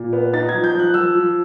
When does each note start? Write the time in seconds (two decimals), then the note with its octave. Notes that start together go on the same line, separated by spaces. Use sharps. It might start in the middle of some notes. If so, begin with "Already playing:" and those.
Already playing: A#2
0.13 B3
0.34 D#4 A6
0.49 G#6
0.54 F3
0.64 G6
0.74 F3
0.79 F#6
0.94 F3 E6
1.15 F3